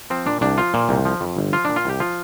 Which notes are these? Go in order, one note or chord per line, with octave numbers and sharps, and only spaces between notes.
F3 C4
A#2 D4
C2 D4
F3 F4
A#2
C2
F3
F2
G1
F3 F4
A#2 D4
F4
C2 G4
F3 F4